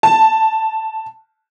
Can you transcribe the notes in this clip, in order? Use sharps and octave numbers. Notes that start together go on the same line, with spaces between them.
A5